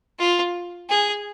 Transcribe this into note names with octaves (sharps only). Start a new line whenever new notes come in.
F4
G#4